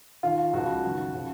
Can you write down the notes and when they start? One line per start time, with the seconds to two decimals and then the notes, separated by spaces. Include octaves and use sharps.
0.23 D#2 D#3 F4
0.53 C#2 C#3 F3 F#4
0.83 F#2 D#3
1.13 C#3 F3